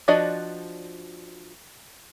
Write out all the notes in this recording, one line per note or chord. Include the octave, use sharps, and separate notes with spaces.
F3 D4 F#4 D5 D#5